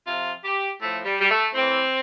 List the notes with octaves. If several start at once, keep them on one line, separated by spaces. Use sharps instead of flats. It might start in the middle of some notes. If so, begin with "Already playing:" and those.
C3 F3 F4
G4
A2 F3 A3
G3
G3
A3
A2 E3 C4